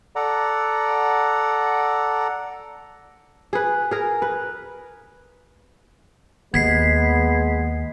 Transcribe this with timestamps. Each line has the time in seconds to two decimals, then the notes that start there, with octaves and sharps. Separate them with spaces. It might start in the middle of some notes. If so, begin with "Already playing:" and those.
0.16 A4 D5 F#5 A#5
3.53 G#4 B4
3.91 G#4 A#4
4.22 B4
6.54 D#2 G#3 B3 G#6 B6 C7